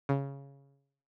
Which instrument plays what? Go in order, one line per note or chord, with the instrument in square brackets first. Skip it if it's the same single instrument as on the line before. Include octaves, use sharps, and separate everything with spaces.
[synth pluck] C#3